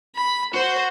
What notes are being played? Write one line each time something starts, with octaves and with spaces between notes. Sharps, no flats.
B5
F#4 C5